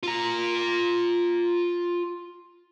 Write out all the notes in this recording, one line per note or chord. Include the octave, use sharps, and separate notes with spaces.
F4 A#5